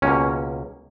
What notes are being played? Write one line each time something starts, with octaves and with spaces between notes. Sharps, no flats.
C#2 B2 A#3 C#4